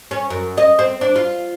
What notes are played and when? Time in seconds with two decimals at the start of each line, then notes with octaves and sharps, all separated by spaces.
0.11 C#4
0.30 F#2
0.57 D#5
0.79 C4
1.01 D4
1.16 F4